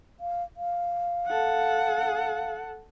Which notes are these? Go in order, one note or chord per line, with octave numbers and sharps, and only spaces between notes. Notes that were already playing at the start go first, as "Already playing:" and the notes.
F5
F5
A4 F#5